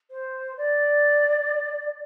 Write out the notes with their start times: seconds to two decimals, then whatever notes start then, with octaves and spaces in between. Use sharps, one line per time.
0.10 C5
0.57 D5